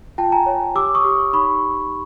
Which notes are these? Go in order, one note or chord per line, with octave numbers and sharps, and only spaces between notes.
F4 G5 A5
G#5 A#5
C#5
G4 D6 E6
C#6 D#6
G4
D#4 B5 C#6